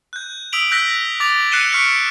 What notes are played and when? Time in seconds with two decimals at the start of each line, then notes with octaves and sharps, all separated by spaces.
0.13 F#6 G6
0.53 D#6 E6 B6 D7 F7 F#7
0.71 E6 F#6 G6 A#6 B6 F#7
1.20 D6 A6 F7
1.52 F#6 C7 C#7 D#7 E7 G7
1.73 C#6 F6 B6 C#7 D7